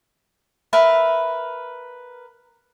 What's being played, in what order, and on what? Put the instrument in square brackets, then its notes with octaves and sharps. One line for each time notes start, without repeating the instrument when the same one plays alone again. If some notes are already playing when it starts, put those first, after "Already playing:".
[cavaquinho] A#4 B4 E5